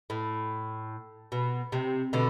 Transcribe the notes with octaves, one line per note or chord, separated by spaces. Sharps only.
A2
B2
C3
B2 D3